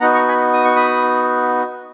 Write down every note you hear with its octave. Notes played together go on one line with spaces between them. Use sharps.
B3 D#4 F#4 F#5 A#5
A#5 C#6
G#5 B5
D#6
C#6
B5 D#6